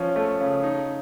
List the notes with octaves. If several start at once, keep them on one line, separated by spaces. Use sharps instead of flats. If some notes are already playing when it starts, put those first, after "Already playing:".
Already playing: F3 C#4
A3
C#3
D#4